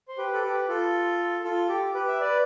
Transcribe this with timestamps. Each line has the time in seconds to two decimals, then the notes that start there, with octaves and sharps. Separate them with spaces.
0.08 C5
0.18 G4 B4
0.34 A4
0.43 G4 B4
0.68 F4 A4
1.44 F4 A4
1.69 G4
1.94 G4 B4
2.08 E5
2.20 B4 D5